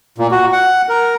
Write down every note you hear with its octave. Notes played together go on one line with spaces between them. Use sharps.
A#2
F#4
F#5
A#4